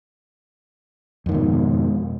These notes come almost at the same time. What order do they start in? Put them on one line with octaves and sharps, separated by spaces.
F2 D#3 G#2 B2